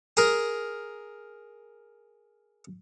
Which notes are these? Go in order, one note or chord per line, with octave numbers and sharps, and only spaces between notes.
G#4 A#4